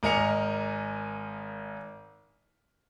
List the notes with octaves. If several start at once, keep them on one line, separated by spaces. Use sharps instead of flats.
G#1 A#4 D#5 G#5 C#7 F7